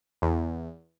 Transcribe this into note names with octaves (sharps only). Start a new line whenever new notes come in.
E2